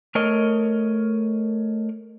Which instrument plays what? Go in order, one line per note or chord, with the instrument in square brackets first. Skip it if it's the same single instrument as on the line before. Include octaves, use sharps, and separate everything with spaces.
[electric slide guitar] A3 A#4 C#5 D#5